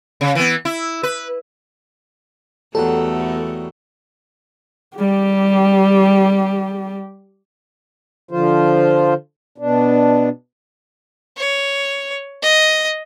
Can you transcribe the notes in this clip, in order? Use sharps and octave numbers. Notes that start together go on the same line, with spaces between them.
C#3
E3 B3
E4
B4
E2 F#3 G3 A3 A4 F#5
C#6
G3 G4
D3 F3 F4 C5
B2 D4
C#5
D#5